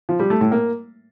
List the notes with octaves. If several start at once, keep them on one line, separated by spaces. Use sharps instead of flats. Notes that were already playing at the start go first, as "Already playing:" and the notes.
F3
G3
A3
A2
A#3